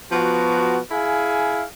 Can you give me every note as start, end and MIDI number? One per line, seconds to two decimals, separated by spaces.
0.12 0.80 53
0.12 0.80 59
0.12 0.80 66
0.92 1.64 64
0.92 1.64 68
0.92 1.64 77
0.92 1.64 80